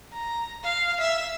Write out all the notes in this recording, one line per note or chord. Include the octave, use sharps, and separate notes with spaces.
A#5
F5
E5